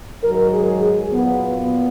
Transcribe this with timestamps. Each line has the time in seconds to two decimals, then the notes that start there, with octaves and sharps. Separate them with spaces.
0.23 G#2 D#3 F#3 A#4
0.53 G#4
0.82 G#4
1.12 A#2 F#3 B3
1.57 B3